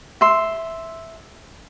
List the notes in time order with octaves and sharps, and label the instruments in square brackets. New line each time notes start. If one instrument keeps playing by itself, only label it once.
[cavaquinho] E5 C6